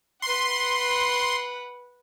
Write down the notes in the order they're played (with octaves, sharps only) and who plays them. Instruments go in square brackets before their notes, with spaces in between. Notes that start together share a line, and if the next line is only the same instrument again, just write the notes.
[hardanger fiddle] B4 F#5 [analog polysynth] C6